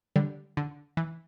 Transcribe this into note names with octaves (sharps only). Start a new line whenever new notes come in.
D3 G3
D3
E3